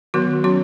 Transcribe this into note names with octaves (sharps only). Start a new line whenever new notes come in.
D#3 F#3 B3 F#4
F#3 C#4 F#4